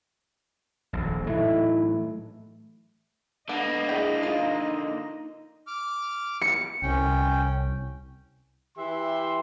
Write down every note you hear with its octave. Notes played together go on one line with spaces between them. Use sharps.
D#1 A#1
A2 E3 F#3 A3 D#4 E4
D3 A#3 B3 D#5 F5
E4 G#4 G5
D#4 F4
D6 F6
C#7
C2 C#4 G5
E3 G4 E5 C6